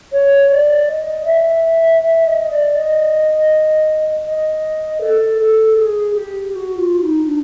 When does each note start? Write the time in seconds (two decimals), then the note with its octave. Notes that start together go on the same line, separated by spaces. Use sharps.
0.12 C#5
0.50 D5
0.88 D#5
1.24 E5
2.00 E5
2.26 D#5
2.51 D5
2.75 D#5
4.26 D#5
5.01 A4
5.39 A4
5.76 G#4
6.14 G4
6.52 G4
6.55 F#4
6.77 F4
7.02 D#4
7.26 D4